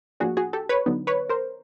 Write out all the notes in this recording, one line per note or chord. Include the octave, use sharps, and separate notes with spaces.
A2 F3 A#3 D4 F#4 G#4
F#4 G#4
G4 A4
B4 C#5
D3 F#3 B3 D#4
B4 C#5
A#4 C5